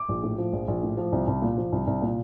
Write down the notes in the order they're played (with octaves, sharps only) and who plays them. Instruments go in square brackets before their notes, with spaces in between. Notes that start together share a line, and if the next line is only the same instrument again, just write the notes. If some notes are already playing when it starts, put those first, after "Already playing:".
Already playing: [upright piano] D6
A#1
A2
F3
A#1
A#1
A2
F3
C2
C2
A#2
F3
C2
C2
A#2